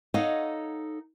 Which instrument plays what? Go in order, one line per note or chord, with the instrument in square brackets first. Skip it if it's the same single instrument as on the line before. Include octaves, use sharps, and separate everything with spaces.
[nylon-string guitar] D#4 A4 C#5 D#5 F5 F#5